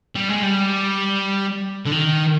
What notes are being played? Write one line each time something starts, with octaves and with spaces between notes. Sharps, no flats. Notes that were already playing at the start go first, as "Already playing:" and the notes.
G3
G#3
G3
D3
D#3